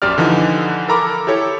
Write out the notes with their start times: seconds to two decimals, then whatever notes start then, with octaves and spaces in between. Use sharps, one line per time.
0.02 A#1 F#2 G4 D5 F6
0.18 D3 E3 F3 D#4
0.88 A4 A#4 A#5 B5 D6
1.27 E4 G4 A4 C#5